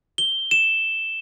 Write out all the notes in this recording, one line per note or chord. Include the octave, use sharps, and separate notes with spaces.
G7
E7